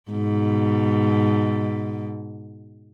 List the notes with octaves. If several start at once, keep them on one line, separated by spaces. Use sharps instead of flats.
G#2 B2